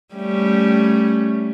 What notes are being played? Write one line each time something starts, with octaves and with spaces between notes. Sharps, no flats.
G3 A3 C#4